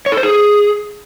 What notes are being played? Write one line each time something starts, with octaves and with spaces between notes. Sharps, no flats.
C#5
A4
C5
G#4